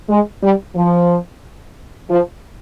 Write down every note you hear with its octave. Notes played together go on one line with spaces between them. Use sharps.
G#3
G3
F3
F3